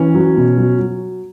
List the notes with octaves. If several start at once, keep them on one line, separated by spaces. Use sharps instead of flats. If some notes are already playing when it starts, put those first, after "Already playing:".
Already playing: E3 C#4
F#3
B2
F#3
F#3